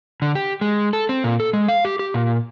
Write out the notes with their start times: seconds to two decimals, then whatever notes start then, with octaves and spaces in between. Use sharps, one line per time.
0.22 D3
0.35 G4
0.61 G#3
0.93 A4
1.09 C4
1.24 A#2
1.40 A4
1.53 G#3
1.68 F5
1.85 G4
1.99 G4
2.14 A#2